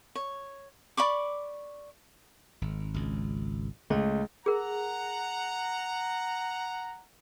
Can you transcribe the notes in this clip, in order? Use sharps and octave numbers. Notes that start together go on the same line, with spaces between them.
C#5
D5 B5 C#6 D6
G#1
G#1 C#2
C#2 A3
G#4 A#4 F#5 A#5